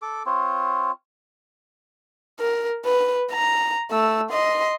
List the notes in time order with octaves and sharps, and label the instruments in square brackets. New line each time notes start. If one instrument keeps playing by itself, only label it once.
[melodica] A4 D6
C4 F4 C#5
[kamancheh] A#4
B4
A#5
A3 E6
D#5 C6